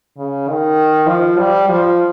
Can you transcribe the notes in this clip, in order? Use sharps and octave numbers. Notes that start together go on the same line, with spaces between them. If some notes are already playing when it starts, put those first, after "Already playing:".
C#3
D#3
F3
G3
F3